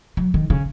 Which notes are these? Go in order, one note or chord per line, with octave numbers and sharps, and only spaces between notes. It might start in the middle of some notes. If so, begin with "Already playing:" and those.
F#3
D#3
C#3